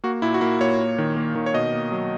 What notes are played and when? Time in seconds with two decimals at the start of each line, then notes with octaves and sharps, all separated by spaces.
0.04 A#3 F#4
0.22 A#2 E4
0.34 F#4
0.41 A#3 E4
0.60 A#2 C#5
0.79 A#3
0.98 D#3
1.16 A#3
1.35 D#3
1.46 C#5
1.54 B2 D#5
1.74 A#3
1.92 F#3